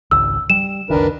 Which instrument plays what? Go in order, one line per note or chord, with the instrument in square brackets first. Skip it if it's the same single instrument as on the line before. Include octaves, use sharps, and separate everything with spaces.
[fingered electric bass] G#1 C#2 [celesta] E6
[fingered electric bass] G3 [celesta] E7
[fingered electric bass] F#1 C#2 D#3 [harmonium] D4 A#4 B4